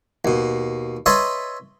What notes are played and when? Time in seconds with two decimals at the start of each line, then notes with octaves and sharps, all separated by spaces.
0.25 D#2 B2
1.06 B4 C#5 D#5 E5 A5 C6